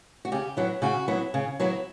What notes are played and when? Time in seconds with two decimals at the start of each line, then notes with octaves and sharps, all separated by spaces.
0.25 F#4
0.32 C#3 G4
0.57 F#3 B3 E4
0.82 C#3 F#4
1.08 F#3 B3 E4
1.34 C#3
1.60 F#3 B3 E4